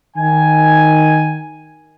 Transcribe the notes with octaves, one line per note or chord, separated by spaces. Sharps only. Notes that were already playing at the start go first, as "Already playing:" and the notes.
D#3 G#5